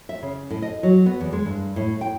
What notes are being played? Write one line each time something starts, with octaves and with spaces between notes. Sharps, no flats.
E5
C#3
A2
D#5
F#3
B3
E2
G#3
G2
A2
G5